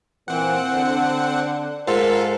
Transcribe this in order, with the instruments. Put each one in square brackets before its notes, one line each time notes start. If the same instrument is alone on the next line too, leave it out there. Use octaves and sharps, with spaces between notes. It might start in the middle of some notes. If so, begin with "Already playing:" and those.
[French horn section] A#2 E3 [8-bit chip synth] C4 F#5
[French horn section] D3
[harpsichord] G#2 [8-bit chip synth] F4 A4 [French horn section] A#4